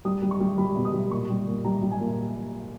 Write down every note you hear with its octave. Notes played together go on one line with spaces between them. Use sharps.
G3 D#6
G3
C#6
G3
G3 B5
B2
D#6
G3
A#2 C#6
G3
A#2
G3 A#5
G3
G#5
A#2